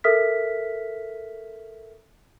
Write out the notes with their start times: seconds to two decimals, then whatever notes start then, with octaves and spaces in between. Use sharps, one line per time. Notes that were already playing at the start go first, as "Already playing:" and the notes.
0.04 A4 A#4 E5 D#6 F6 B6